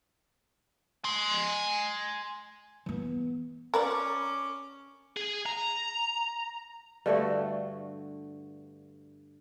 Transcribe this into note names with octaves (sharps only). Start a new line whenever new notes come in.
G#5 C6
E3 B3
C#4 A#4 B4 D5 D6
G#4
A#5
G2 D3 A3 F#4